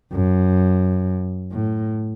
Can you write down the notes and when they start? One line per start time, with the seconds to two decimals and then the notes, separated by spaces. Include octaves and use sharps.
0.13 F#2
1.52 A2